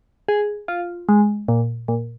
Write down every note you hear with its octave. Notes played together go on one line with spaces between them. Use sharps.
G#4
F4
G#3
A#2
A#2